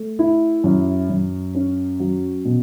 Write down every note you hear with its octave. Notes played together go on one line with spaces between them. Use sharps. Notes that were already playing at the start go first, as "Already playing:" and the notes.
Already playing: A3
E4
F#2
F#2
C#4
F#3
B2